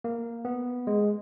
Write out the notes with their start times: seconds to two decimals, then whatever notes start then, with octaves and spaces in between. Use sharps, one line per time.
0.04 A#3
0.45 B3
0.87 G#3